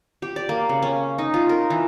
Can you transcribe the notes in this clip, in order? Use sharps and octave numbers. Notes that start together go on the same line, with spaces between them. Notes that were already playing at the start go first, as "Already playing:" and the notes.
G4
D5
A#3
C#3
C#4
D#4
F4
A#4
E3